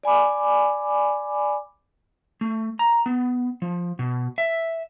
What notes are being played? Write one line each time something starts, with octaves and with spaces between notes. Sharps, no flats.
D5 G#5 B5 D6
A3
A#5
B3
F3
B2
E5